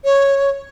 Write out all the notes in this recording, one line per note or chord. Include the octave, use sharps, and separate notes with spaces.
C#5